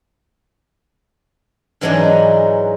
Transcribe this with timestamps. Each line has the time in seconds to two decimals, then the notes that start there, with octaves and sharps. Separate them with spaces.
1.81 G#2 E3 F#3 G#3 D4 D#4